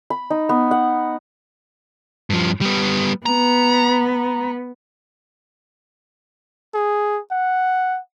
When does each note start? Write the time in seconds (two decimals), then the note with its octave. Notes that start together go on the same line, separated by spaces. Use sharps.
0.10 B5
0.30 D#4
0.49 B3
0.71 F#5
2.30 G2 F3
2.61 G3 B3
3.26 B3 A#5
6.74 G#4
7.31 F#5